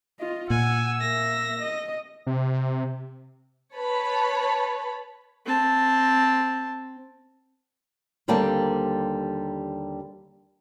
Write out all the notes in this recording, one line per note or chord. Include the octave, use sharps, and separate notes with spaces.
F4 D#5
A#2 F#5 G#5 E6
A#3 E5 A#6
D#5
C3
B4 C#5 A5 B5
C4 A5
D#2 D3 G3 A#3 C4 A5